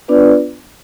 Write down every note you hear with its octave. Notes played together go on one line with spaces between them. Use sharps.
B3 D4 F4 B4 D5